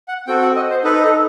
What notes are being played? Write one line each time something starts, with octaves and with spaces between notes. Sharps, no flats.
F#5
C4 F#4 A4 G5
F#5
D#5
C5
D#4 A4 B4
A4